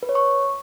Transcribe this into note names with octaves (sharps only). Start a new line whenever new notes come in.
B4
C#5
C#6